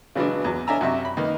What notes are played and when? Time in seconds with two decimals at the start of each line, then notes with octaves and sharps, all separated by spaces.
0.15 C#3 E3 F#3 G#3 B3 D4
0.44 E2 F#3
0.67 C#4 D4 E5 G#5 A#5 E6
0.81 F#2 C3 E5 C#6
1.05 B5
1.17 D#3 A#3 B3 D#4